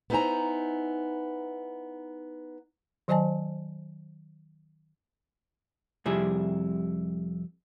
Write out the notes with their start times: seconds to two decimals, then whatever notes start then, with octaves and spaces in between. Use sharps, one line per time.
0.10 B3 D#4 E4 C5 G#5 A#5
3.08 D#3 F#3 C5 D#5 G#5 A5
6.06 F2 C3 G3 E4 G#4